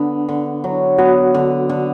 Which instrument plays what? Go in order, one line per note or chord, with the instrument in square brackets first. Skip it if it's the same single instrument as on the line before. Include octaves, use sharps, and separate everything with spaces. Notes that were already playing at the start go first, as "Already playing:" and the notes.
Already playing: [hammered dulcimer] D3 B3 [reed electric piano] D4
[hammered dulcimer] D3
F#3
[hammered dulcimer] B3 [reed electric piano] F#4
[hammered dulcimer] D3
D3